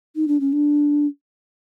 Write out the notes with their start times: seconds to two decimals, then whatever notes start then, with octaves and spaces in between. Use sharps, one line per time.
0.16 D#4
0.28 D4
0.40 C#4
0.53 D4